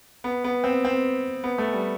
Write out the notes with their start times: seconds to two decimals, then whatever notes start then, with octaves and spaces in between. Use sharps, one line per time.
0.24 B3
0.44 B3
0.64 C4
0.85 C4
1.44 B3
1.58 A3
1.73 G3